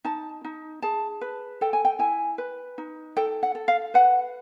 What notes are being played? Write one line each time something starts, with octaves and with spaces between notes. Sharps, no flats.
D#4 A5
D#4
G#4 A5
B4
A4 G5
G#5
G5
E4 G#5
B4
D#4
A4 G5
F#5
A4
F5
B4 F#5